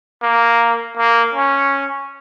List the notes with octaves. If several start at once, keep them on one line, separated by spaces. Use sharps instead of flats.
A#3
A#3
C#4